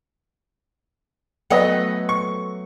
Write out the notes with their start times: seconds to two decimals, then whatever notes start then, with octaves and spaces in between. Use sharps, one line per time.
1.50 F#3 A3 B3 B4 D#5 F#5
2.09 C#6